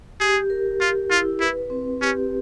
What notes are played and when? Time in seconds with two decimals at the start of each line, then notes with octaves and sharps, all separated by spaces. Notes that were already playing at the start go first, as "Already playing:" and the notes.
0.20 G4 G#4
0.50 A#4
0.80 F4 G4
1.10 E4 F4
1.40 E4 B4
1.70 C4
2.01 C#4 G4